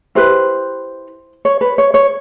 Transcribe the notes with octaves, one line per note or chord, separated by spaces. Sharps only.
E4 G4 B4 C5
C#5
B4
C#5
C#5